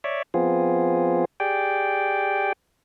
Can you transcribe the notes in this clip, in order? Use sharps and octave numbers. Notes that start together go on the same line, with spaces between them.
C#5 D5 E5
F3 B3 C4 F4 G#4
G4 G#4 D5 G5